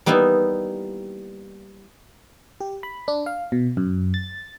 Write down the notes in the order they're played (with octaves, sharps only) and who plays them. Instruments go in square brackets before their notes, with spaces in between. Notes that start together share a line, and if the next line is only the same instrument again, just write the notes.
[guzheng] G3 A#3 B3 D#4 E4
[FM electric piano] G4
B5
D4
F5
B2
F#2
A6